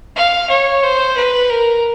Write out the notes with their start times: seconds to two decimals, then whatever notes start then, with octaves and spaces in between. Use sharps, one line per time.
0.16 F5
0.49 C#5
0.83 C5
1.17 B4
1.50 A#4